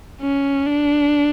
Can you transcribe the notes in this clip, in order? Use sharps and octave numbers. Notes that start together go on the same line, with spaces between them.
C#4
D4